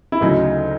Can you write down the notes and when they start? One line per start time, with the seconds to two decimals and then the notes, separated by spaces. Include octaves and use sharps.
0.12 E4
0.21 D2 C#3 F#3 D#4